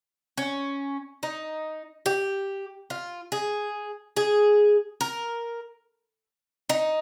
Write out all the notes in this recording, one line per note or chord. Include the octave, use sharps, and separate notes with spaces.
C#4
D#4
G4
F4
G#4
G#4
A#4
D#4